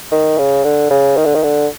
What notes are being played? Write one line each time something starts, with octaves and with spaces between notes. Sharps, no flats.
D#3
C#3
D3
C#3
D#3
D3
D#3
D3